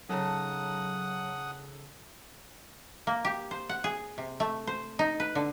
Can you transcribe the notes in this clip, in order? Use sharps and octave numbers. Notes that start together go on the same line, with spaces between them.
C#3 F#3 D#4 A4 F#5 A5 A#5 D#6
A#3
G4
C5
F#5
G#4
C3
A3
C5
D#4
B4
D3